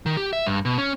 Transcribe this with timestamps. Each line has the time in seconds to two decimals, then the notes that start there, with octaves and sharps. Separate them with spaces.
0.06 D#3
0.17 G4
0.33 E5
0.47 G2
0.65 B2
0.78 C#4